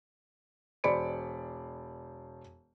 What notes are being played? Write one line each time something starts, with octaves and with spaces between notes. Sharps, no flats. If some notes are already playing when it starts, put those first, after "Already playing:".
E1 C5 D5 B5 C#7 D7